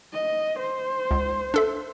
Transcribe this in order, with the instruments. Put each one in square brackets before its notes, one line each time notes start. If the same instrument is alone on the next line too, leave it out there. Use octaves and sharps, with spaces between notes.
[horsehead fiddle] D#5
C5
[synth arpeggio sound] C#2
D4 A4 E5